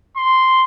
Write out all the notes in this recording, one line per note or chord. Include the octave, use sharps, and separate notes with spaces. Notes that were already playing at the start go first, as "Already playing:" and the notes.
C6